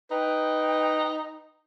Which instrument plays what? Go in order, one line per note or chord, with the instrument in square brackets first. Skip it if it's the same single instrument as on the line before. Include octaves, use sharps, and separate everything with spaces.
[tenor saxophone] D#4 [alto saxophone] B4 [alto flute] G5